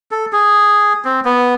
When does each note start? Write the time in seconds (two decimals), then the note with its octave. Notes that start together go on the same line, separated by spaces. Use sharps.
0.11 A4
0.33 G#4
1.05 C4
1.25 B3